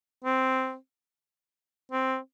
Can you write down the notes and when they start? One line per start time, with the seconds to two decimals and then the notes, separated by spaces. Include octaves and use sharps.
0.24 C4
1.92 C4